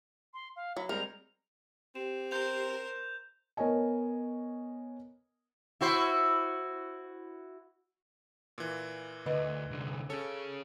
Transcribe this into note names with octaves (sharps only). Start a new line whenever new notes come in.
C6
F5
F#3 B5
G3 G#3 C4 A#4 F7
C4 G4 E7
A#4 C5 G6 F7
B3 A#4 C#5 D#5 G#5
E4 F#4 C5
A#2 E3
D2 B4 D#5
C2 D3
C#4 G#4 A4 C#5